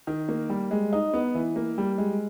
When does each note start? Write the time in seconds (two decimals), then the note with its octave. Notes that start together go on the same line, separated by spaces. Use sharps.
0.07 D#3
0.29 A#3
0.50 G3
0.71 G#3
0.93 D#4
1.14 B3
1.35 E3
1.56 A#3
1.78 G3
1.98 G#3